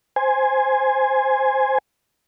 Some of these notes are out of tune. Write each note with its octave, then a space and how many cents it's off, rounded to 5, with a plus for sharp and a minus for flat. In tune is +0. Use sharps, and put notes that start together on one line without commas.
C5 +0 G#5 +0